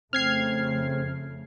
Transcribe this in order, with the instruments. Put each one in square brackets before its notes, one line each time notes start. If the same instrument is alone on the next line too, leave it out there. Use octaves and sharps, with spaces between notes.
[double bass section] F2 C#3 A3 [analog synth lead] C4 [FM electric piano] F6 G#6 C7